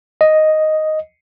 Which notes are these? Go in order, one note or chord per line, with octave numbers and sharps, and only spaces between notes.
D#5